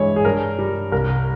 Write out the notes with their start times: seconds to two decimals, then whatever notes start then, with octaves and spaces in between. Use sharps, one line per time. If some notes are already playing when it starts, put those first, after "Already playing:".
Already playing: G2 E3 G#3 E4 C#5
0.16 G#4
0.25 G2 A#4
0.59 G3
0.92 C2 A#4